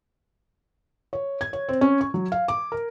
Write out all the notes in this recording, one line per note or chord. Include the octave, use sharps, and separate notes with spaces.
C#5
G#6
C#5
C4
C#4
C#6
F#3
F5
D6
A#4